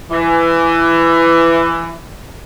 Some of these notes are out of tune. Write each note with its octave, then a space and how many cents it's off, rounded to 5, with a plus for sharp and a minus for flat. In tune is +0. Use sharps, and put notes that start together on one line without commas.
E3 +15